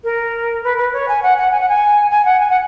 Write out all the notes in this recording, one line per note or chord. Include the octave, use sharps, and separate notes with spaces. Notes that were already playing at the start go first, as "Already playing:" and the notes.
A#4
B4
B4
C#5
G#5
F#5
F#5
G#5
F#5
G#5
G#5
F#5
G#5
F#5